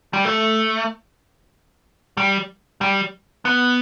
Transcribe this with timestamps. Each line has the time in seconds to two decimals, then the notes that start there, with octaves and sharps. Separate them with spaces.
0.13 G3
0.25 A3
2.17 G3
2.81 G3
3.45 B3